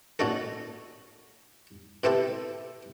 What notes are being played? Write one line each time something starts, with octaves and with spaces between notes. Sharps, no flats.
A#2 C#4 D#4 F#4 A4
B2 C4 E4 G4 A4